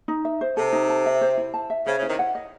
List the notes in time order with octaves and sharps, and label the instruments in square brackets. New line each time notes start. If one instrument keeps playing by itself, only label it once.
[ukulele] D#4
E5
C5
[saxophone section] C3 [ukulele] A4
[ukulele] D#4
A5
E5
C5
E4
A5
E5
[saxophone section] C#3 [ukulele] C5
[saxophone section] C#3
[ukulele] E4
[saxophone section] C3 D#3
[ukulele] F#5
D#5